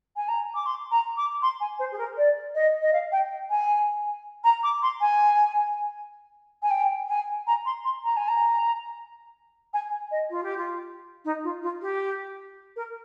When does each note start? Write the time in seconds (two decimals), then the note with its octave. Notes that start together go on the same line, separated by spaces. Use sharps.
0.16 G#5
0.29 A#5
0.55 D6
0.66 C6
0.91 A#5
1.17 D6
1.42 C6
1.60 G#5
1.79 C5
1.92 G#4
1.98 A#4
2.18 D5
2.55 D#5
2.82 D#5
2.93 F5
3.12 G5
3.50 G#5
4.44 A#5
4.63 D6
4.82 C6
5.01 G#5
6.63 G#5
6.71 G5
7.09 G#5
7.47 A#5
7.66 C6
7.84 C6
8.04 A#5
8.17 G#5
8.28 A#5
9.74 G#5
10.11 D#5
10.30 F4
10.43 G4
10.58 F4
11.25 D#4
11.44 F4
11.63 F4
11.82 G4
12.76 A#4